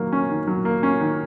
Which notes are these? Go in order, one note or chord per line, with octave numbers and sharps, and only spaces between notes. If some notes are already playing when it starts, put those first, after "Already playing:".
Already playing: D#3 F#3 A#3
C#4
D#3
F#3
A#3
C#4
D#3